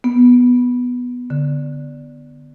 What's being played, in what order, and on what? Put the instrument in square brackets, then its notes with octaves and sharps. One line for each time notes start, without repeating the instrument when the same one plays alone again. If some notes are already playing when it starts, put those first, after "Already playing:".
[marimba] B3
D3